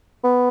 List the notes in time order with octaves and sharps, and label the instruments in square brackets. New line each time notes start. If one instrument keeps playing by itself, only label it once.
[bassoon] B3